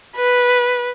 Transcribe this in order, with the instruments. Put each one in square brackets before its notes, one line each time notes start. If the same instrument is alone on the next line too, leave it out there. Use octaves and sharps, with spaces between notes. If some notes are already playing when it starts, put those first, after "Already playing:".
[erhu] B4